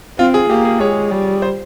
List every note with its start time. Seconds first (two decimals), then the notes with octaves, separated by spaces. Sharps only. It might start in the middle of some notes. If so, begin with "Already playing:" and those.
0.18 C4 F4
0.34 G#4
0.50 A#3 G4
0.65 G#4
0.81 G#3 C#5
1.11 G3
1.42 C5